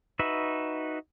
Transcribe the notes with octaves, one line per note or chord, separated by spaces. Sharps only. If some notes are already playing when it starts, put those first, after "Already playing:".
D#4 F#4 B4 E5